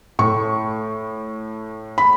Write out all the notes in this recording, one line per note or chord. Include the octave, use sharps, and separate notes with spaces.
A2 A3 C#6
B5